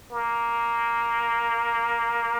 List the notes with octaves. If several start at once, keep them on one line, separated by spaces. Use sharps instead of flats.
A#3